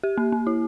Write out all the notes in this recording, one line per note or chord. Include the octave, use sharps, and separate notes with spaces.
G4
A#3
A#3
E4